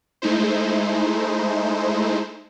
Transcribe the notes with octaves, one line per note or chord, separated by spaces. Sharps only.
G#3 A3 D#4 E4 C5